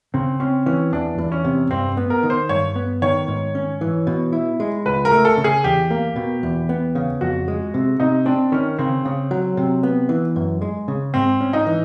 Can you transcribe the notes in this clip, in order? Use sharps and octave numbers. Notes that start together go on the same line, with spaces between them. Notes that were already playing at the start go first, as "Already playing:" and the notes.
C#3 C4
C4 C#4
E3 C#4
E2 D4
E2
C#4
C3
G2 C4
B3
A#4
D#3
C5
G2 C#5
B3
D#3 C#5
G#2
C#4
E3
B2
E4
G#3
C#2 B4
A#4
A3
A4
C#3
G#4
E2 G4
A#3
B2
E2
B3
C#3
F2 F#4
G#3
C3
C3 D#4
C4 D4
D#3 C#4
C#3 C4
C#3
F#3
C3
B3
E3
F#2
G#3
C#3
G#2 C4
C#4
D#4
E3